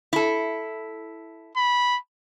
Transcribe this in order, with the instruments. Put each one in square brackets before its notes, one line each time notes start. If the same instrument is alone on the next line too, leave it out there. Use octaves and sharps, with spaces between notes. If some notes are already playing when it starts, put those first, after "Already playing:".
[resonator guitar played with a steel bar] E4 A4
[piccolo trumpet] B5